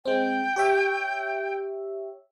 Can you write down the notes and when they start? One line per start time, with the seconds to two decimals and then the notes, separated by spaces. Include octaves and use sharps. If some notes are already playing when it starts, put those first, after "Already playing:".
0.05 G#3 C4 G5
0.56 G4 C#5 E5